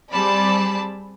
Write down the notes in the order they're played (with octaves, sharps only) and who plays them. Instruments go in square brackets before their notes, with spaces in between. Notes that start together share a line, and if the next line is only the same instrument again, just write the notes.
[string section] G3 C4 G#4 D5 A5 B5